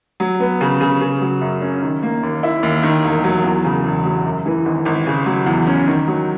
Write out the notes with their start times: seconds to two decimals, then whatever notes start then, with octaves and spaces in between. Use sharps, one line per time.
0.20 F#3
0.40 B3
0.61 C#3
0.81 C#3
1.01 C#3
1.22 F#3
1.41 F#2
1.62 C#4
1.82 D#3
2.02 A#3
2.23 D#2
2.43 E4
2.63 D#2
2.83 D#3
3.04 E1
3.24 F#3
3.44 E2
3.64 C#3
3.84 E1
4.05 F#3
4.25 F#2
4.46 E3
4.65 G#1
4.85 G#1
5.07 C#3
5.26 F#3
5.46 E2
5.67 C#4
5.87 D#3
6.07 F#3